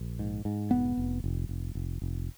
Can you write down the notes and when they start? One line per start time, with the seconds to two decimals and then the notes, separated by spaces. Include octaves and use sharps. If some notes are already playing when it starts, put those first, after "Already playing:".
Already playing: A#1
0.19 G#2
0.45 G#2
0.71 F1 B3
0.97 F1
1.24 F1
1.49 F1
1.75 F1
2.02 F1